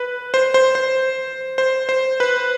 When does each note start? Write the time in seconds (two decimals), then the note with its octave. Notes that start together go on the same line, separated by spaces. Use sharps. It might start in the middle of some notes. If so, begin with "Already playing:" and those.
Already playing: B4
0.34 C5
0.54 C5
0.75 C5
1.58 C5
1.89 C5
2.20 B4